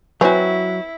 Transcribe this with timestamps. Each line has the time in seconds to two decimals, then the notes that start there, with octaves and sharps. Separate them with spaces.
0.21 E3 F#3 C4 E4 F#4